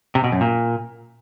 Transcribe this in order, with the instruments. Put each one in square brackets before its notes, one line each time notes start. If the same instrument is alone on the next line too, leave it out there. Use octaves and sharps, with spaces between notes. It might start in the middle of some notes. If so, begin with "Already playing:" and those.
[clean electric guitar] C3
B2
F#2
A#2